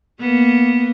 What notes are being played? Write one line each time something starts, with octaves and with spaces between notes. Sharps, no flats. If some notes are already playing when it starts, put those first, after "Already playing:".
A#3 B3